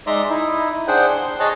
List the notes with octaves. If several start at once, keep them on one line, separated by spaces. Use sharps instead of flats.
G#3 D#4 D5 E5 A#5 C6
D#4 E4
D4 G#4 C5 F#5 G5
C6
G#4 C#5 D#5 A5 F#6